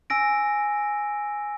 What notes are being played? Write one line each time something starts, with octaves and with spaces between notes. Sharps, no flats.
G#5 E6 A#6 D7